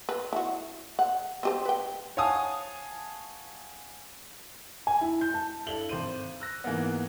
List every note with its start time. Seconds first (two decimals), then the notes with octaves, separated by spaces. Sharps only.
0.09 B4
0.33 E4 F#4
0.99 F#5
1.43 C4 G4 C5
1.65 B4 G5
2.17 C#5 F5 F#5 G#5 A5 D#6
4.87 G#5
5.01 E4
5.21 G6
5.34 A5
5.66 G2 D4 E4 A4 F#7 G7
5.89 G#1 C5 D#7
6.40 E6 F#6 A#6
6.64 G#2 E3 A#3 B3